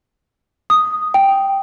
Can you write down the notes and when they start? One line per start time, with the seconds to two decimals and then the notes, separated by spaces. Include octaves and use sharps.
0.70 D#6
1.14 G5